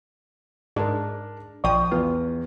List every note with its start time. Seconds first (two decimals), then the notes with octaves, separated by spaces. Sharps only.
0.76 G#2 D4 G#4 A#4
1.64 A#1 F3 D5 G5 C#6 D#6
1.92 E2 F4 B4